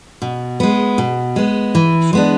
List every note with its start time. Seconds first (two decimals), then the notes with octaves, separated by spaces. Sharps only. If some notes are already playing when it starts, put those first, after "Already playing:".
0.22 B2
0.60 G#3 B3
0.98 B2
1.36 G#3 B3
1.75 E3
2.13 G#3 B3 D4